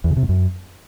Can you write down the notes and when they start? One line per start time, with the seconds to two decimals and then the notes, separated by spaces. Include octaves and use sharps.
0.04 E2
0.10 C#3
0.17 C3
0.23 G#2
0.29 F#2